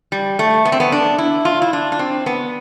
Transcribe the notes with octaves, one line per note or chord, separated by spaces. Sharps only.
G3
A3
B3
C4
B3
D4
E4
F4
E4
D4
D4
C4
B3